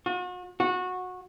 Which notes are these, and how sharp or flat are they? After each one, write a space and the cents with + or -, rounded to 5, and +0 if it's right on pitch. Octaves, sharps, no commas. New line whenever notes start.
F#4 -40
F#4 -20